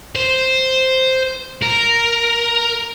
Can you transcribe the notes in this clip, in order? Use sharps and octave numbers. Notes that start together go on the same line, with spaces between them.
C5
A#4